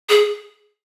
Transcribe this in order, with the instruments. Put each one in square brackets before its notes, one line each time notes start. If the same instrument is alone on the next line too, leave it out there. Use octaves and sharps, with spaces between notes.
[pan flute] G#4